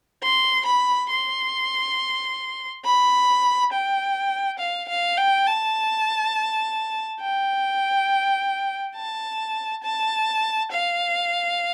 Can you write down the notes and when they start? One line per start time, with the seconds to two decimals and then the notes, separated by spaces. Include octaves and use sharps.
0.23 C6
0.66 B5
1.10 C6
2.85 B5
3.72 G5
4.59 F5
4.88 F5
5.17 G5
5.47 A5
7.21 G5
8.96 A5
9.83 A5
10.71 F5